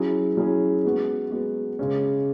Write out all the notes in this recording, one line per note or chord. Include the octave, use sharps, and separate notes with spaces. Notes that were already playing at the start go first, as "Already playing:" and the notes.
Already playing: F#3 C#4 E4 G#4
F#3 C#4 E4 G#4
G#3 B3 F#4
G#3 B3 F#4
C#3 G#3 C#4